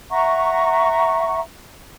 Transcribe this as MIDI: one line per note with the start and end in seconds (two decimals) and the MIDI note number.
0.10 1.40 76
0.10 1.40 78
0.10 1.40 82
0.10 1.40 85